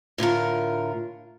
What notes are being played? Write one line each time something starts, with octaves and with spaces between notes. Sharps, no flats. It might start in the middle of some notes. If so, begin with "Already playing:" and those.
A2 D3 F4 A#4